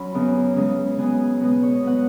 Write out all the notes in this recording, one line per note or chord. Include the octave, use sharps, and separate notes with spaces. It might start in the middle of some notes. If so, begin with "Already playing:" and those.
Already playing: F#3 C#4 B5
F#2 C#3 B3
C#3 G#3 C#4
C#3 F#3 B3 G#5
B2 G#3 B3
C#5
D#5
B2 F#3 B3 F#5